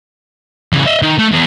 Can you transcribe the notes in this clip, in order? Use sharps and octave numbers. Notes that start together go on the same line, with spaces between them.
C#3 E3
D#5 E5
D#3
A3
E2